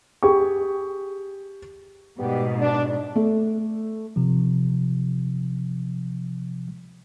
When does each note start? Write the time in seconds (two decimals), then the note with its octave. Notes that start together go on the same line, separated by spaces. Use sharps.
0.23 G4 G#4 C#6
2.19 G#2 B2 G3 B3 G4
2.59 D4
3.16 A3
4.16 C3 F3